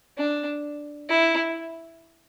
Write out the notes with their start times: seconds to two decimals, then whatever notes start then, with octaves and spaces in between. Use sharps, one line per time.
0.17 D4
1.09 E4